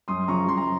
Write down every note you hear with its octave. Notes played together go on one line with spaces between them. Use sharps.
F#2 C6 D#6
D#6
C#3 F3 A#5 C#6
F#2 C6
A#5